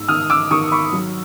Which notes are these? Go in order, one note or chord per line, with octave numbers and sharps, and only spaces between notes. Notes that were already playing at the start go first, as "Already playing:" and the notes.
Already playing: G#2 E6
D#3 D#6 F6
D6 E6
D#3 C#6 D#6
B5 C#6
F#3